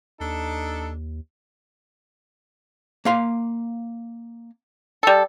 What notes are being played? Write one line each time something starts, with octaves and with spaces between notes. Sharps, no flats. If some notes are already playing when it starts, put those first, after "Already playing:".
D#2 D4 D#4 A4
A#3 F5 C6
G3 A4